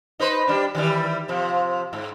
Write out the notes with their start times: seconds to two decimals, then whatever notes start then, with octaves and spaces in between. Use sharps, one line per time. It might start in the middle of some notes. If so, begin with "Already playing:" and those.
0.19 D#4 B4 C5
0.48 G3 D4
0.75 D#3 E3 G3
1.28 C3 F3
1.93 G#2